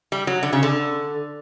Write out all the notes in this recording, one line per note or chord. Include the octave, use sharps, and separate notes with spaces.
G3
F#3
D3
C#3
D3